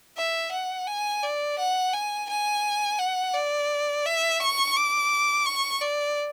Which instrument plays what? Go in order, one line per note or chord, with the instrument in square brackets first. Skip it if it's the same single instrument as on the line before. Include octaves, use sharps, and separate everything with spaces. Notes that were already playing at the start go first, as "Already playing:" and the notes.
[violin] E5
F#5
G#5
D5
F#5
G#5
G#5
F#5
D5
E5
C#6
D6
C#6
D5